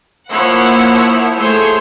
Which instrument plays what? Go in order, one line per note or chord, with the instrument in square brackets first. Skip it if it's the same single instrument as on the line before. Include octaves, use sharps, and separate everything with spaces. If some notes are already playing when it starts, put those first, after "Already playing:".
[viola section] F3 E4 C#5 [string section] A#3 F#5
[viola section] A3 C5 C#5 [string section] G#4